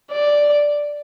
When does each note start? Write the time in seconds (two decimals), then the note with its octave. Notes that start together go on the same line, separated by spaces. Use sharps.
0.12 D5